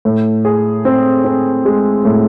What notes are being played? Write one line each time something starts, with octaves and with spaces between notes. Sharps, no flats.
A2
G#4
C4
C4
G#3
A2